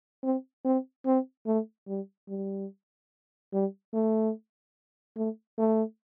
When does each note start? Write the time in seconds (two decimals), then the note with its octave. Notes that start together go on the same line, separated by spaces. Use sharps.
0.23 C4
0.65 C4
1.06 C4
1.47 A3
1.88 G3
2.29 G3
3.53 G3
3.93 A3
5.17 A3
5.58 A3